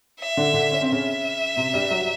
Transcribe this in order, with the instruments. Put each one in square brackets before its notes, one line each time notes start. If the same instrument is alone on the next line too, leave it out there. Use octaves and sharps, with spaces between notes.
[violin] E5
[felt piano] D3 D4
D3 D4
C#4
C4
[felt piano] C#3 C#4 [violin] E5
[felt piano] C3 C4
G2 G3
F#3